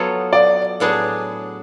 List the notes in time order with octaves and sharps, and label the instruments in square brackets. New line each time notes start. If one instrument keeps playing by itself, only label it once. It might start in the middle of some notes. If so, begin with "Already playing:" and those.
Already playing: [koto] F#3 B3 F4 A4 C#5
[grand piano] D5
[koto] A2 F#3 B3 D4 G#4